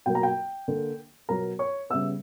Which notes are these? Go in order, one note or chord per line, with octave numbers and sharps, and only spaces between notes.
B2 F#3 A#3 G5
A#5
G5
D3 A#3
B2 F#3 B3 A#4 A#5
C#5 C#6
C#3 G3 B3 E5 E6